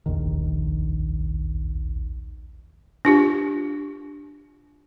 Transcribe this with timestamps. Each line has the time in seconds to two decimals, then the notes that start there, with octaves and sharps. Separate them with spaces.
0.06 F1 A#1 D#2 D#3
3.05 D4 F4 G4